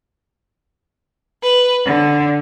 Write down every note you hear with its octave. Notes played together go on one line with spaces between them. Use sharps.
B4
D3